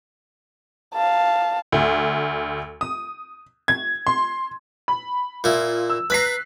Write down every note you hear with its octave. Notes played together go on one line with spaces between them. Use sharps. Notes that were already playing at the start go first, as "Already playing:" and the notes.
F5 A5
D2
D#6
G#6
C6
B5
A#2 E4 F4
E6
B4 A#5 F#6 B6 C7